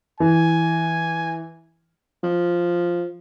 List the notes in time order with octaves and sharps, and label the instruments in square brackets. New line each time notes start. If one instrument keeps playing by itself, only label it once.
[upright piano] E3 [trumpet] G#5
[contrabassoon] F3